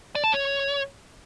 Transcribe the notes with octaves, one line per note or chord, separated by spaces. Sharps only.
D5
A5
C#5